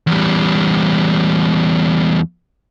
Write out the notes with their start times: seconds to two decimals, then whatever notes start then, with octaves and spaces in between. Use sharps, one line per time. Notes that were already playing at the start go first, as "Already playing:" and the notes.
0.07 E2 G3